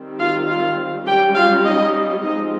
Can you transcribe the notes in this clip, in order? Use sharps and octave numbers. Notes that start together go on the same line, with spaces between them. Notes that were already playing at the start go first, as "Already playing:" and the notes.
Already playing: D#3 G3 C4
F4 F5
F4 F5
G3 C#4 G4 G5
F4 F5
D#4 D#5
F3 G#3 C4 D#4 D#5